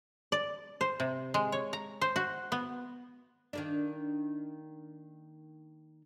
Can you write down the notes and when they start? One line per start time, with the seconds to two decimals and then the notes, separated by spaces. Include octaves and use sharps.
0.32 D5
0.81 C5
1.00 C3
1.34 G#3
1.52 C#5
1.73 A#5
2.01 C5
2.16 F#4
2.52 B3
3.53 D#3 A#3 D4